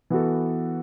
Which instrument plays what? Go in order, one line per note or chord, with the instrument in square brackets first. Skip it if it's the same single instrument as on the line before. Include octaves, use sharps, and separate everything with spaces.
[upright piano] E3 B3 F#4 A4